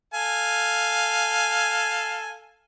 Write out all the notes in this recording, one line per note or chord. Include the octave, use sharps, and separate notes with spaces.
A4 F5 G#5